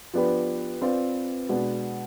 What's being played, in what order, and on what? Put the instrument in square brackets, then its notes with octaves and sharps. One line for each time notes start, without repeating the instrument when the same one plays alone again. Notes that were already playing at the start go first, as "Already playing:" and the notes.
[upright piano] F3 B3 D4 G4 B4
C4 F4 B4 D5
B2 G#3 B3 D4